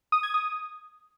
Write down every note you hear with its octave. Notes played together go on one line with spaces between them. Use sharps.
D#6
G#6
D#6